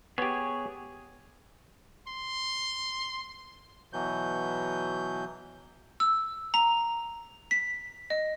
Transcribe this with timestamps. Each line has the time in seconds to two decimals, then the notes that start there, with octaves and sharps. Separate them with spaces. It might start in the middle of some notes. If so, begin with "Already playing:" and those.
0.18 B3 G4 G#4 C#5
2.08 C6
3.93 B2 E3 F#3 G6
6.00 E6
6.54 A#5
7.51 B6
8.10 D#5